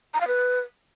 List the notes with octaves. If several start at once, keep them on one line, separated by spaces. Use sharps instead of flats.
A#5
F5
B4